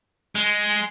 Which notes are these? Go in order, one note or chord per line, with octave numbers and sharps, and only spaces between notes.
G#3